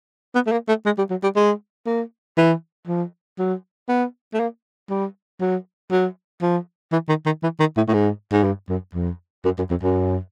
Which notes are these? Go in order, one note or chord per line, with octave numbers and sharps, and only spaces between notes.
B3
A3
A#3
A3
G#3
G3
F#3
G3
G#3
A#3
E3
F3
F#3
B3
A3
A#3
G3
F#3
F#3
F3
E3
D#3
D#3
E3
D#3
A2
A2
G#2
G#2
G2
F#2
F2
F#2
F#2
F2
F#2